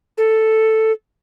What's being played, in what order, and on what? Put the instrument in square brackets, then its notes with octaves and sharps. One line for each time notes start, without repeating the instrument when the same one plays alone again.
[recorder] A4